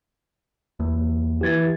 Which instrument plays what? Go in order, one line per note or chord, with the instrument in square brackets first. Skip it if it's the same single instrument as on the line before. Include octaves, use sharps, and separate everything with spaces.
[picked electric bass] E2 [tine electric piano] A#3
[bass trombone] E3 [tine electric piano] G4 G#6 A6